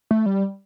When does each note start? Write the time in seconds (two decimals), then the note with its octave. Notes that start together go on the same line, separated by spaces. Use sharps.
0.11 A3
0.26 G3